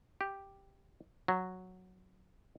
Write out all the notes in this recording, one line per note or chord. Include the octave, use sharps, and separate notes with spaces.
G4
F#3